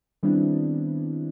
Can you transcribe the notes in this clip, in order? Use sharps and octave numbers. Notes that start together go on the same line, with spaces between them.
D#3 G3 B3 C4 D4 E4